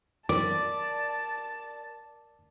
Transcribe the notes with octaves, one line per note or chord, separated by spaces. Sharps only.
A#4 D5 A5 D6 A6